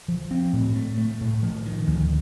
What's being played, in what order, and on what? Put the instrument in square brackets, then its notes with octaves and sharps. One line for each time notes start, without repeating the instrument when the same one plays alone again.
[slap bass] F3
C4
A2
A3
A3
A2
F3
D#3
D2